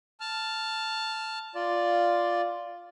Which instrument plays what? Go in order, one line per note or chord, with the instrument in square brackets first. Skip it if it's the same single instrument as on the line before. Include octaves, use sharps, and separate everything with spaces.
[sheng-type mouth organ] A5 F6
F4 D5